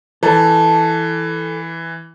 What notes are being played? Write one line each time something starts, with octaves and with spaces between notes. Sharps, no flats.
E3 A4